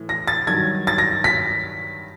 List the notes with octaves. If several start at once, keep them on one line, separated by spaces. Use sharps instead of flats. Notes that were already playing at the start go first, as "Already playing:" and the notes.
Already playing: A2 E3
A#6
A6
G2 D#3 F#3 G#6
A6
A#6
B6